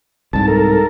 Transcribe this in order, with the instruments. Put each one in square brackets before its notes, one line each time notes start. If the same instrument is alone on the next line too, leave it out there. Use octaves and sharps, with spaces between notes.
[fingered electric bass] C2 G#2 [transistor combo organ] A5
[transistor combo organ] A4 A#4